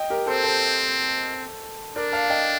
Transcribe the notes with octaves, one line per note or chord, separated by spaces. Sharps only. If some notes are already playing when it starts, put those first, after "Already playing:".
Already playing: D#5 G5
G4 A#4
C4 A4 C5
A4 C5
D4 A#4 D5
F5 A5
D#5 G5